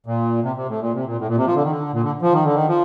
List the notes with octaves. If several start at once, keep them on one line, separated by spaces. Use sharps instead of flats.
A#2
C3
C3
A2
A#2
C3
A#2
A2
A#2
C3
F3
D3
D#3
D3
A#2
D3
F3
D#3
D3
D#3
F3